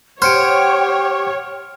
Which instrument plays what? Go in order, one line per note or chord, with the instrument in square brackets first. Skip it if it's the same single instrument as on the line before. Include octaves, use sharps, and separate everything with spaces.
[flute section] G4 F#5 G5 [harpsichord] C5 [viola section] C#5 [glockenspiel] F6 C#7 D7